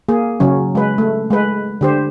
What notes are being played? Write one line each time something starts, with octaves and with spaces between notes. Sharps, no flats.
A#3 G#4
C#3 F#3 C#4
G#3 B4
A3
G#3 B4
D3 G4 C5